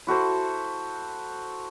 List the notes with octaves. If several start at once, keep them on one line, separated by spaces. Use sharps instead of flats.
E4 F#4 A4 C5